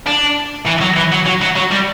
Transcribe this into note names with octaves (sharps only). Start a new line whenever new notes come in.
D4
E3
F#3
E3
F#3
F#3
F#3
F#3
G3